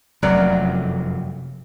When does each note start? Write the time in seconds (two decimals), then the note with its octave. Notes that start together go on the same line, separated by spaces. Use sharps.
0.23 F1 F#2 C3 F#3 A#3 D5